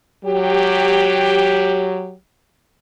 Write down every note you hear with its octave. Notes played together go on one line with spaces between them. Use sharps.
F#3 G4